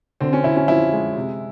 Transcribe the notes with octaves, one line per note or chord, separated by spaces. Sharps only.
D3 C4
C#4
D3 E4
C#4
F3 E4
G#3
C3